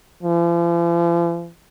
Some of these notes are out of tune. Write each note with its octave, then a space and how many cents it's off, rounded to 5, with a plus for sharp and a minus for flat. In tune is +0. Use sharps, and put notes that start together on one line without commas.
F3 -45